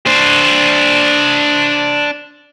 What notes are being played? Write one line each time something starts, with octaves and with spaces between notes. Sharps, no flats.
D4 C5